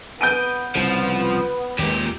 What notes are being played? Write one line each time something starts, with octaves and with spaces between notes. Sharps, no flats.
B3 G6 D7 D#7
C2 C#3 F3
D#2 A#2 G#3 G4